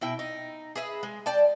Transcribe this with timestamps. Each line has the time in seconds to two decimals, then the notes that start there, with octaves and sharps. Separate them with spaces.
0.01 B2 E4 G5
0.19 D#4
0.76 G#4 B4 E5
1.03 G#3
1.26 D5 G5 A5